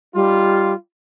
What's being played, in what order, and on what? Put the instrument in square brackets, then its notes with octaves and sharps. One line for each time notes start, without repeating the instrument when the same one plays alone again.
[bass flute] G3 [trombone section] D#4 F4